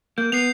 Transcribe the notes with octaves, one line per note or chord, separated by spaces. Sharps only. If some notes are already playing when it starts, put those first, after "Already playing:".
A#3 G6
B3 C7 F7